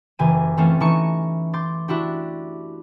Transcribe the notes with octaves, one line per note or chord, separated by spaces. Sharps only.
F#1 E3 G4 G#5 D#7
E3 A3 C4 C#4 F4
E3 D#4 A5 C#6 C#7
C6 D6 G6 A6
D4 E4 F#4 G4